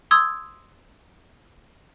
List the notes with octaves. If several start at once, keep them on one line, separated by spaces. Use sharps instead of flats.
C6 D#6 E6 G#6